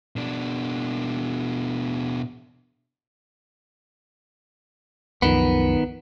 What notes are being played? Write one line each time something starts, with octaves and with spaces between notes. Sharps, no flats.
B2 D4
C2 F#2 D#3 F3 B3